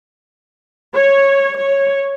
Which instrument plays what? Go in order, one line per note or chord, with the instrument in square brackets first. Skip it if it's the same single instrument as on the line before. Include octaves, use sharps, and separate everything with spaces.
[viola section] C#5
C#5